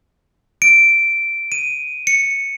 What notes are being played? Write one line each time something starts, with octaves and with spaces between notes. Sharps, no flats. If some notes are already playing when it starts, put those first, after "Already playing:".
D7
D#7
C#7